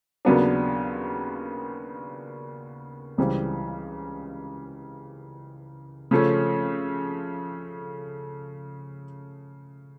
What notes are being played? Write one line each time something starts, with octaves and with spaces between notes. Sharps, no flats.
D#2 C#3 F#3 B3 D4
C#2 C#3 E3 G3 C4
C#3 F3 A3 C#4